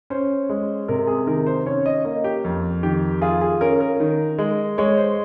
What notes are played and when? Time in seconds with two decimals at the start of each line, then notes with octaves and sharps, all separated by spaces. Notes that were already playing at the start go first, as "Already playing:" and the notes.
0.10 C#4 C5
0.49 G#3
0.88 C3 A#4
1.07 G#4
1.27 D#3 A#4
1.46 C5
1.66 C#4 C#5
1.86 D#5
2.05 A#3 D#5
2.24 G4
2.44 F2
2.83 D#3 G4
3.22 F4 G#4
3.41 G#4
3.61 C#4 A#4
3.80 A#4
4.00 D#3
4.38 G#3
4.78 G#3 C#5
4.97 C5